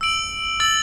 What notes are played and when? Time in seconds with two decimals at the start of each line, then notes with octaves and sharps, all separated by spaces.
0.01 E6 D7 F#7
0.60 E6 A6 F#7